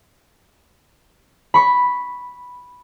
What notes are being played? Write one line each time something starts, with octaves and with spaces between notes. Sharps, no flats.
B5 C#6